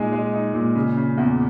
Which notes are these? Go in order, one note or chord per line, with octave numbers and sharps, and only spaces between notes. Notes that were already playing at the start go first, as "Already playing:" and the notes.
Already playing: A#2 G#3 D#4 G#4
G#3
D#4
A#2
C#3
C#3
E2